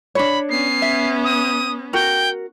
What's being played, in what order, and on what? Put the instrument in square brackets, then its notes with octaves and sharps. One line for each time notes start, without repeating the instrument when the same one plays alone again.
[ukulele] D4 C#5 [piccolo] B5
[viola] B3 C#4 [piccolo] C7
[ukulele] E5
[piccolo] D#6
[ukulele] F#4 A#4 [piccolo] G5